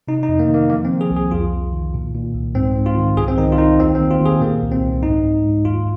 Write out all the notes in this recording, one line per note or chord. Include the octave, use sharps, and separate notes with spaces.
C3 D#4
D#4
F2
A#3
D#3
A#3
F3 A#3
C4
F3
G#4
C2
G#4
F2 F4
F2
D#3
A#2
A#2
C2
G#2 C4
G#2
F4
D#3
C2 G#4
C4
D#3 D#4
F4
D#3 D#4
D#2 C4
C4
D#2
F4
D#2
G#4
A#2 A#3
C2
C4
C2
G#2 D#4
G#2
G#2
D#2 F4